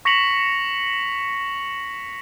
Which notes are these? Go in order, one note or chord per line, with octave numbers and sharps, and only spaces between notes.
C#6 A#6 B6 C#7 F7 F#7